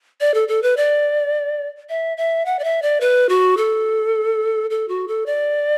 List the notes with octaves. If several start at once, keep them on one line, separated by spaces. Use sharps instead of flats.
D5
A4
A4
B4
D5
E5
E5
F#5
D5
E5
D5
B4
F#4
A4
A4
F#4
A4
D5